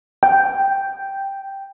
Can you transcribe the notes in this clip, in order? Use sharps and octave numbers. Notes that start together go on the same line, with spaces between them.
G5